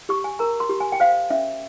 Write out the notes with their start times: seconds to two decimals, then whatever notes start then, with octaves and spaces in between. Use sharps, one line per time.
0.09 G4 C#6
0.24 G#5
0.39 A#4 A#5
0.60 C6
0.70 G4
0.80 G#5
0.92 G5
1.00 C5 F5
1.30 C#4 E5